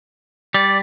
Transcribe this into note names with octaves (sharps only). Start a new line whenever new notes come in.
G3 D5